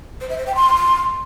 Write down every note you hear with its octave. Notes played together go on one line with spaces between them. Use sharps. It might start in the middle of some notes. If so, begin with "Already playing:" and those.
C5
E5
C5
G5
C6